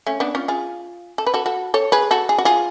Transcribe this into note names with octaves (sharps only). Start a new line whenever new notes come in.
A3 C#4
B3 D4
C#4 F4
F4 G#4
A4
B4
F#4 A4
F#4 A4
A4 C#5
G#4 B4
F#4 A4
G#4
F#4
F4 G#4